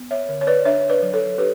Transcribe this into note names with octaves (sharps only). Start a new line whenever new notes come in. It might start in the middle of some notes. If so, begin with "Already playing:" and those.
Already playing: B3
C#5 E5
D3
C#5
B4 D5
D4 C#5 E5
B4 D5
F#3
A4 C#5
D4 G4 B4